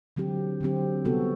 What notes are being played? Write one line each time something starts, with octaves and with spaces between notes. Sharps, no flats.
D3 F#3 C4 G4
D3 F#3 C4 G4
C3 G3 B3 F#4 A4